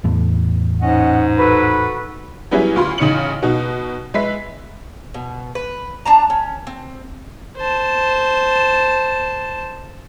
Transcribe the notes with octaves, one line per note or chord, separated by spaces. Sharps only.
E2 A2
G#2 C#4 D#5 F#5
F#4 A4 B4
F#3 G3 B3 C#4 E4 G#4
D2 F4 B5 C6
A1 C#3 D#4 F6 C#7 F#7
B2 D#4 F#4
G#3 B4 E5 B6
B2
B4
D4 A5 A#5
C#4
C4
C5 A5